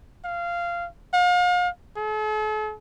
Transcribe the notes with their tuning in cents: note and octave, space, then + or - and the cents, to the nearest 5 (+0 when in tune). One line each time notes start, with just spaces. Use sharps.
F5 -15
F5 +40
A4 -45